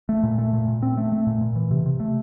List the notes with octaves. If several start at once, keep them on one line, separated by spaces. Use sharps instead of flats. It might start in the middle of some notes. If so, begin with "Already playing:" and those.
A3
A#2
A3
A#2
A#2
C4
A3
A3
A#2
A#2
E3
C3
C3
A3